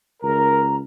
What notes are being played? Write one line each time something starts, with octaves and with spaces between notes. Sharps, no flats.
C#2 A#4 A#5